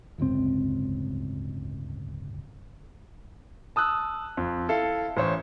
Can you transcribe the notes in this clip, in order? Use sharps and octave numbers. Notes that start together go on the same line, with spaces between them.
D1 G1 C#2 C4
A5 D#6 E6 F#6
F2
E4 A4 F5
A1 C5 C#5